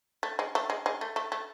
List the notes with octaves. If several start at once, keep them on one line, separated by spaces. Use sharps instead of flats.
A3
G#3
A3
G#3
G#3
A3
A3
A3